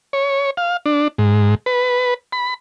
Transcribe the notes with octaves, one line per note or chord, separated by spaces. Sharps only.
C#5
F5
D4
G#2
B4
B5